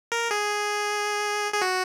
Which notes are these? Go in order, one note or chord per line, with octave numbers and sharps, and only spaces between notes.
A#4
G#4
G#4
F#4